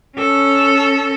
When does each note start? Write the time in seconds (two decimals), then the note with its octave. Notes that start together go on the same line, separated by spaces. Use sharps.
0.18 C#4 A4